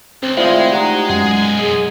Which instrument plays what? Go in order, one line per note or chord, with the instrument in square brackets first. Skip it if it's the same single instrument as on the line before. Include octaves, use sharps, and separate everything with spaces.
[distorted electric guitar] C#2 [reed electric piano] C4
[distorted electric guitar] G#3 [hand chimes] A3 D5 G5 [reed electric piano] E4 F4 C5
[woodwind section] D#4 A#5 [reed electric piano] G4 F#5
[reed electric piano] F#2 [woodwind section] G#3 [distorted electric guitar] G#4 [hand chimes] F#5
[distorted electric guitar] B1 G#5
[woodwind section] G#4